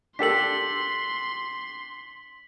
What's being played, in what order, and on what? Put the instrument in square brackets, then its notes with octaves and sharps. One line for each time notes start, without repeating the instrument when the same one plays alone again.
[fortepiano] D4 G4 A4 [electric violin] C6 [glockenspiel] B6 F#7